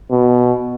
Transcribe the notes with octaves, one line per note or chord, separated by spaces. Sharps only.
B2